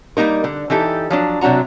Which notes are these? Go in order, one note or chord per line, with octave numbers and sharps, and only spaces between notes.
G3 A#3 D#4 A#4
D3
E3 D#4 G4 A4
F3 F#3 D4
C3 F#3 D4 F#4 A#5